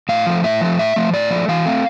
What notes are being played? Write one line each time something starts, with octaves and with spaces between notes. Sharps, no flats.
A2 F5
F3 A3
A2 E5
F3 A3
A2 E5
F3 A3
A2 D5
F3 A3
E3 F5
A3 C4